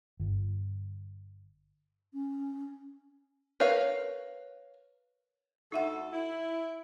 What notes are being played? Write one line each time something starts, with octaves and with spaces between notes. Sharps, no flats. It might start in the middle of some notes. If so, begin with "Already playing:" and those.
G1
C#4
A#4 B4 C#5 F5
D2 D#4 A4 E5 F#5
E4